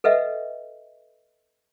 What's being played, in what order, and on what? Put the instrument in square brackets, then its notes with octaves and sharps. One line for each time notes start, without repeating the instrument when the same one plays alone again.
[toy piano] A4 B4 D#5 E5 F#5